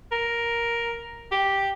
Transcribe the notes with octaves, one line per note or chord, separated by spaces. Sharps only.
A#4
G4